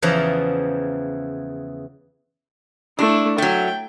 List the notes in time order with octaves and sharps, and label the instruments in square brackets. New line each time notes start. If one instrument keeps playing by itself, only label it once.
[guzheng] E2 C#3 E3 F3 A#5
[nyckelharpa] A3 E4 [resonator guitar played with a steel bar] D4
[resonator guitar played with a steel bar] F#3 A3 [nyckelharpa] G5